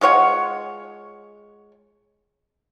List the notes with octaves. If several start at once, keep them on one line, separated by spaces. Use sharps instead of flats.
G#3 F4 C#5 F#5